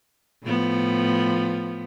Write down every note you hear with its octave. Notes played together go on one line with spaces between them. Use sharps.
A2 F3 B3